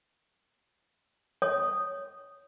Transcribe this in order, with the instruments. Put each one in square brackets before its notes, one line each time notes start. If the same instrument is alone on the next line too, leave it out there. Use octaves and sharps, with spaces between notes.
[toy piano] C#5 D#6